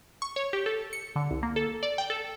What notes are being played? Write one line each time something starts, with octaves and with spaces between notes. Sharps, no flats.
C#6
C#5
G4
A4
C#7
D3
C2
A#3
A4
D5
G5
A4